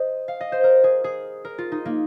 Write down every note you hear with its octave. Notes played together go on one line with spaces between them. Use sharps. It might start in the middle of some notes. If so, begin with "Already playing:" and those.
Already playing: C5 D#5
F5
D#5
C5
A#4
G#4
G#4
A#4
F4
D#4
A#3